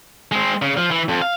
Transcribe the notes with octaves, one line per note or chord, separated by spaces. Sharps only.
G#3 C4
C#3
F3
E3
F2
F5